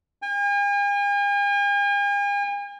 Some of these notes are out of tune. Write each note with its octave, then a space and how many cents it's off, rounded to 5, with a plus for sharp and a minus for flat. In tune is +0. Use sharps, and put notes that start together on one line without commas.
G#5 -45